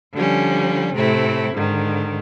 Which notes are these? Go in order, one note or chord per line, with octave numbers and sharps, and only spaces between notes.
D3 F3 G3 C#4
A2 C3 A3 C4 E4
G#2 D3 D#3